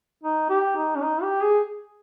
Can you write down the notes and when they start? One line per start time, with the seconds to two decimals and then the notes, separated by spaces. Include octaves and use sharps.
0.23 D#4
0.49 G4
0.77 D#4
0.95 C#4
1.03 D#4
1.22 G4
1.42 G#4